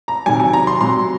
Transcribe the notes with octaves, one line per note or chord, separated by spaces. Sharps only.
A#5
C3 D#3 F#3 G#5
G#5
A#5
C6
C3 F#3 C6